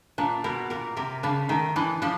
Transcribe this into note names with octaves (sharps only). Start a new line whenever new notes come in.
A#2 D4
B2 A#4
A#2 A#4
C3 A#4
C#3 D4
D#3 A3
E3 D4
F3 D4